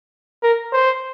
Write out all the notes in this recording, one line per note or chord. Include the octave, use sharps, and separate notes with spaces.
A#4
C5